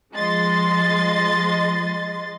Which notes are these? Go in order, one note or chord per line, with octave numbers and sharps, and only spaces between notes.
F3 G#3 D#5 C6 A6